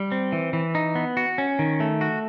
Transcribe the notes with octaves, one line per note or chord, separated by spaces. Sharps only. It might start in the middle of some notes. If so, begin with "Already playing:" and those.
Already playing: G3
C4
E3
E3
D#4
B3
F#4
C#4
D#3
A3
F#4